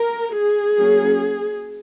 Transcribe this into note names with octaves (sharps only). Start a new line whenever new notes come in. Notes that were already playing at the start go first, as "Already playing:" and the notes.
Already playing: A#4
G#4
F#3 A#3 C#4